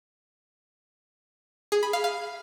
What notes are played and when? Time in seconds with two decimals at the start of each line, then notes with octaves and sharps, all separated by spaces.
1.72 G#4
1.83 B5
1.93 F5
2.04 F5